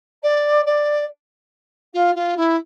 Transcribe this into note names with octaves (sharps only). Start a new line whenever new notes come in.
D5
D5
F4
F4
E4